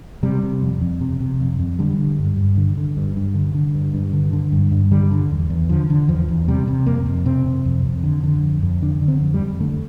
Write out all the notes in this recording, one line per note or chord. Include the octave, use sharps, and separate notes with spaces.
C3 G3
C3
F2
F2
C3
C3
F2
F2
D3 G3
D3
G2
G2
D3
D3
G2
G2
D3
D3
G2
G2
D3
D3
G2
G2
D3 G3
D3
E2
E2
D3 F3
D3
E2 F3
E2
C3 G3
C3
F2 A#3
F2
C3 C4
C3
F2
F2
D3
D3
F2
F2
D3 D4
D3
C4
F2
G3
F2
D3 A3